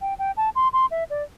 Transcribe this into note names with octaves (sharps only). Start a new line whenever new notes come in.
G5
G5
A5
C6
C6
E5
D5